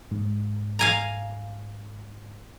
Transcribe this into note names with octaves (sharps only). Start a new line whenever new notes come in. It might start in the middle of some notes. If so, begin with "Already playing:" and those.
G#2
F5 G#5 A#5